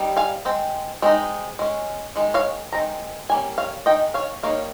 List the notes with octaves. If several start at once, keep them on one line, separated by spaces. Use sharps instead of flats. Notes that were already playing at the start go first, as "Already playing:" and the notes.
Already playing: G3 C4 D#4
F5 G#5
G#3 C4
G#3 C4 D#4
G#3 C#4
D#3 G#3
C#5 F5
D#3 G#3 C4 A#5
G3 A#3 C#4 G#5
C#5 F5
D#3 G#3 D#4 D#5 G5
C#5 F5
G3 A#3 D#4 C#5 F5